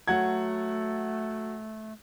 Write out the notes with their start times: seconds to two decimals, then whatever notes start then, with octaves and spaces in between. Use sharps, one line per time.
0.08 F#3 A3 F#5 G#6